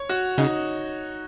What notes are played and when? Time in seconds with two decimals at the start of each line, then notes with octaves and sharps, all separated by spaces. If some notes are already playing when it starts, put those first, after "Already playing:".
Already playing: C#5
0.09 F#4
0.38 C#3 D#4